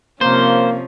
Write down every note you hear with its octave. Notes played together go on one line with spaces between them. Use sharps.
C3 F3 A#3 C#4 C5